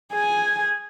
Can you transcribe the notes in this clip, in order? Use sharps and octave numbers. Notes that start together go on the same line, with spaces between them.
G#4 G#5